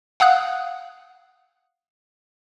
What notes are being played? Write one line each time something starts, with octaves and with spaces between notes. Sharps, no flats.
F5 F#5 D#6 F#6